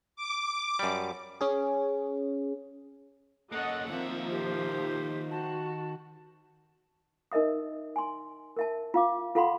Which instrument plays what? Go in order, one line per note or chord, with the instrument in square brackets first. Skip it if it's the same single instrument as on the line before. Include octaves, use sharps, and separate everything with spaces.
[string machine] D6
[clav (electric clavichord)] F#2 G3
[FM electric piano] C#4 G#4
[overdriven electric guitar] A#3 C#4 [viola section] A4 D#5 F#5
[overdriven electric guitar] D#3 E5 [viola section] F3 A#3 [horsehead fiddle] C4
[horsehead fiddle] D#4 C5 [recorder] G4
[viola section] F#4 [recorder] A5
[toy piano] D#4 A#4 D#5 E5 D#6
G#5 C6
A#4 E5 A5
F4 F5 D6
F4 A4 F5 F#5 B5 C6